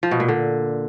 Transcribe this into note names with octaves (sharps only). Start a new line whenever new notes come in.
F3
B2
A#2
D3